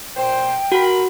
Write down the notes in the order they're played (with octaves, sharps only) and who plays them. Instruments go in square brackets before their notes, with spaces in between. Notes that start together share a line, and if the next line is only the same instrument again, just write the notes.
[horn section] A#2 C5 [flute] G5
[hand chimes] F#4 [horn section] A#4 B5